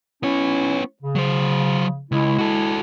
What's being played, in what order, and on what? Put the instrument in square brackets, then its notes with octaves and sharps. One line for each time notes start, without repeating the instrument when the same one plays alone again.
[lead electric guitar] B3 C#5 [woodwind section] C#4 E4
[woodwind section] C#3
[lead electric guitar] F#3 C5
[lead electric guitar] C#2 [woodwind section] G#3 E4
[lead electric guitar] F#4 A4